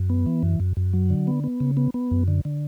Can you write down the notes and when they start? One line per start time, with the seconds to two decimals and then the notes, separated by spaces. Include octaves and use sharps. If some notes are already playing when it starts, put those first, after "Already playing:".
Already playing: F#2
0.10 B3
0.26 E3
0.43 F#2
0.60 F#2
0.77 F#2
0.93 F#3
1.10 D3
1.27 B3
1.44 B3
1.60 C#3
1.77 B3
1.94 B3
2.11 F#2
2.28 D3
2.45 D3